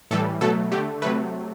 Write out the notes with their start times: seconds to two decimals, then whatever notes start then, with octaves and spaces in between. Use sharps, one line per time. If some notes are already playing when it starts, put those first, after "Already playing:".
0.11 A2 E3 G3 A4
0.41 B2 F#3 A3 A4
0.72 D3 A3 G4
1.02 C3 F#3 A3 B4